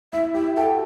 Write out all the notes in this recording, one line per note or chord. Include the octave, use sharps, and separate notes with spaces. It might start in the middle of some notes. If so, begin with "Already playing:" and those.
E4 E5
E4 G4 E5
F#4 A4 G5